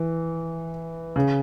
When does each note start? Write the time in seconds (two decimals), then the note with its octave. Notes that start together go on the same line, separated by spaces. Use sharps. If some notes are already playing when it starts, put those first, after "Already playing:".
Already playing: E3
1.16 C#3